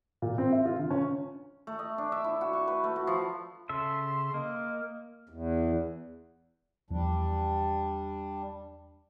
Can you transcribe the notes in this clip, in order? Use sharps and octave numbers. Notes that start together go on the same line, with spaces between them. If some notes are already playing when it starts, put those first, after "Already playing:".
A#2
C4
E5
F4
D3
C#4
A3
D#5
D4
E5
E4
F#4
C#6
B4
A3
F#4
F3
C#3 A4 E5 C6
A#3 D#5
E2
E2 F3 G3 D4